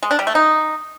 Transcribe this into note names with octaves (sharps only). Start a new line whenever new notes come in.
G#3
D4
G3
A3
D#4